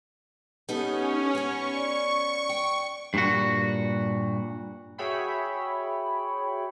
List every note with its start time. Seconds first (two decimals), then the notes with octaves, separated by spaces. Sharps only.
0.69 B3 C#4 D#4 G4 A4
1.35 B3 C#5 C#6
1.74 D5
2.49 G5
3.14 G2 A#2 F#4
4.98 F#4 G#4 C#5 E5 G5 B5